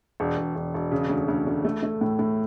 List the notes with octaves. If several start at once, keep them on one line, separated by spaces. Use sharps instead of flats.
E1
E1
E1
E1
C#3
D2
D2
D2
A3
A3
A2
A2